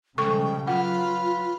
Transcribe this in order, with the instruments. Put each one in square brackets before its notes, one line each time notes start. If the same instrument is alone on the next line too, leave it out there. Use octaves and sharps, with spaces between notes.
[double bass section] C#3 G3 [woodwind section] F3 G#3 [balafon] A4 C#6 [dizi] G5
[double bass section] F#3 [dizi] F4 [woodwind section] B4 F5 B5 [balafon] F#5